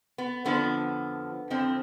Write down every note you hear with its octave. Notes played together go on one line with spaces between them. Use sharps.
B3
F2 D3 F3 B3
F2 D3 F3 C4